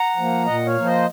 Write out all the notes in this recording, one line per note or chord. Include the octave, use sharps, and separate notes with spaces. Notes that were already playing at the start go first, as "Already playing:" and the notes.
Already playing: F#5 A#5
F3 A#3
A#2 D#5 F#5
C#5 F5
F3 A#3
C5 D#5